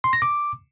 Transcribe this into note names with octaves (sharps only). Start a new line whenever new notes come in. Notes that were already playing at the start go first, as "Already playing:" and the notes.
C6
A#6
D6